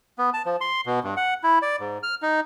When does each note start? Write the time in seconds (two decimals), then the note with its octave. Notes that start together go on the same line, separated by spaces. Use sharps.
0.18 B3
0.34 A5
0.46 F3
0.61 C6
0.86 B2
1.04 G2
1.17 F#5
1.43 E4
1.62 D5
1.79 G#2
2.03 F6
2.22 D#4